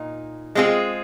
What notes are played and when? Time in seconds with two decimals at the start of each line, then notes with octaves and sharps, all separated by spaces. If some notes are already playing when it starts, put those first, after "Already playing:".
Already playing: A#2 D#4
0.55 G#3 C4 F4 G#4